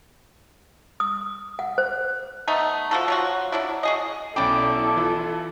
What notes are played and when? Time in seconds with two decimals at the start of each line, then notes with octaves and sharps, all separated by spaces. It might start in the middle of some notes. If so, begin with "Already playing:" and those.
1.00 D#6
1.59 F#5
1.78 C5
2.48 A3 B3 D#4
2.91 F3 F#4 A4
3.08 F#3 F4 F#4
3.52 F#3 D4 E4
3.83 F#4 G#4 D#5
4.36 B1 C#4 E4 A4 D5 G5 B5 D6
4.96 E3 F4